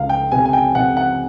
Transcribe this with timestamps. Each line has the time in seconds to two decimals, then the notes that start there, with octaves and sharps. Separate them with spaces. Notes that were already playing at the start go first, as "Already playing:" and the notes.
Already playing: C#2 F5
0.09 G5
0.32 C3 G#5
0.45 G#5
0.53 G5
0.75 C3 F#5
0.97 F#5